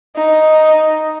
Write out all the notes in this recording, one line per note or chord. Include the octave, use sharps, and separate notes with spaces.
D#4